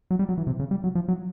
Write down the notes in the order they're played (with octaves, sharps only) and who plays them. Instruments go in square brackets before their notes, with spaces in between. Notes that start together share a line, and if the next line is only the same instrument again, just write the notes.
[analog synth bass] F#3
G3
F#3
E3
C3
C#3
G3
F#3
F3
F#3